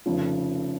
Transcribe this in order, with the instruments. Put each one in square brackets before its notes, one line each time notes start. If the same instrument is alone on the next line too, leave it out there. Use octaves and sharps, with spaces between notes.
[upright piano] F1 F2 C#3 F3